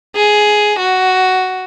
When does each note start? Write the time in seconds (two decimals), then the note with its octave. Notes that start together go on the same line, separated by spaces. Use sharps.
0.16 G#4
0.79 F#4